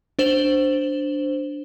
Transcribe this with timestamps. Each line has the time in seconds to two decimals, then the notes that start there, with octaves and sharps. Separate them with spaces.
0.19 D4 C5 E7 F#7 G7